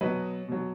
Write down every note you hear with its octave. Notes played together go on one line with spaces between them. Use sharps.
B2 F#3 B4 D#5
B2 F#3